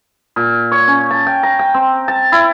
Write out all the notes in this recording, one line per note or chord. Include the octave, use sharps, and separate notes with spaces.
A#2
C#5
C#4
A5
G5
A#5
G5
C4
A5
E4